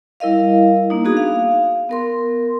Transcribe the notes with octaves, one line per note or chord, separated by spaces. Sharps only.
G3 E4 A#4 D#5 F5
A#3 D4 D#4
B3 F#4 G#4 D#6
F5
B3 A#4 C6